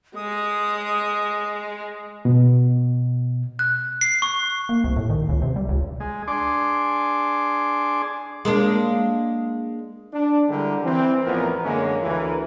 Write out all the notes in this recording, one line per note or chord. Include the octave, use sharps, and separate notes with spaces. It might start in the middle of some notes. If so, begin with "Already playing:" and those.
G#3 D#6
B2
F#6
C7
C#6
A#3
C2
A2
D#3
C#2
C3
G3
C#2
G#3
D4 G#4 C6 D6
G#3 A#3 D4
D4
D3 G3 G#3 E4 G4 A#4
E3 C4
A1 E2 F3 B3 A#4
F#2 D3 G#3 A#3 C#4
D2 E3 A#4